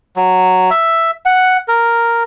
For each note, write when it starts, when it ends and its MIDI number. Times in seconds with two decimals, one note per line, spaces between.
0.16 0.70 54
0.70 1.11 76
1.25 1.57 78
1.68 2.23 70